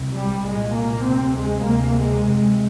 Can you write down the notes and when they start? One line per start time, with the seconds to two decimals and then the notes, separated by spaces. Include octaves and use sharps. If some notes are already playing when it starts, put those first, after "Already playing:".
Already playing: C2 C3
0.14 G3
0.44 C2 A#2 G#3
0.74 A#3
1.05 D2 C3 C4
1.35 G#3
1.65 D2 C3 A#3
1.96 G#3
2.26 F2 C3